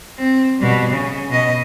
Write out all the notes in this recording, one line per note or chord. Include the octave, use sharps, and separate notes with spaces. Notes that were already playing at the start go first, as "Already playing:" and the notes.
C4
B2 G3
C#3
B2 D#5